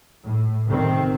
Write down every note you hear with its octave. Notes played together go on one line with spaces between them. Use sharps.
A2
C3 D#3 C4